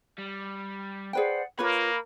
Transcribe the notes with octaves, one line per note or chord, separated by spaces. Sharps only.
G3
G#4 B4 C5 D5 F#5 G5
A#3 F4 A#4 B4 C#5 B5